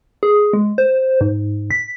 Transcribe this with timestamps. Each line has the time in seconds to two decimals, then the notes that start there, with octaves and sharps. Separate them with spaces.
0.23 G#4
0.53 G#3
0.78 C5
1.21 G#2
1.71 B6